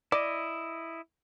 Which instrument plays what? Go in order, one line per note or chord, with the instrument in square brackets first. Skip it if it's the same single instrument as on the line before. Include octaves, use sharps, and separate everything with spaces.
[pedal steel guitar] E4 D#5 [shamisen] D5